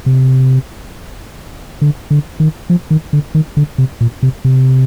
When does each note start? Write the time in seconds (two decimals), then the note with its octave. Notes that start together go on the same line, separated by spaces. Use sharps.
0.06 C3
1.82 D3
2.11 D3
2.40 D#3
2.70 F3
2.90 D#3
3.13 D3
3.35 D#3
3.57 D3
3.78 C3
4.01 A#2
4.23 C3
4.45 C3